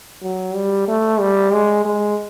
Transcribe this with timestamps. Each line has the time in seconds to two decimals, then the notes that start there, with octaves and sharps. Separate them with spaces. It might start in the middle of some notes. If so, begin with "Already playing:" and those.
0.22 F#3
0.55 G3
0.88 A3
1.20 G3
1.53 G#3
1.85 G#3